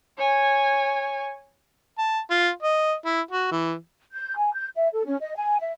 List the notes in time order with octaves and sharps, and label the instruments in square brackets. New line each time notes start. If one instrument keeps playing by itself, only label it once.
[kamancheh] C#5 G#5
[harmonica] A5
F4
D#5
E4
F#4
E3
[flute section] G6
G#5
G6
E5
A4
C#4
D#5
G#5
E5